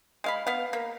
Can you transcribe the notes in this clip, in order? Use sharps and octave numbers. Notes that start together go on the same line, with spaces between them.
G#3 F5 B5
B3 F5
A#3